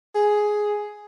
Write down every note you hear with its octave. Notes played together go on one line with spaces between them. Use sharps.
G#4